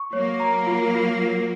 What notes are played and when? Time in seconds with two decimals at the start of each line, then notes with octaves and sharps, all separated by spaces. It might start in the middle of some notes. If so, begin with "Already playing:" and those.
Already playing: C#6
0.13 F#3 A#3 C#5
0.40 A#5
0.67 F4
0.95 F4
1.22 F4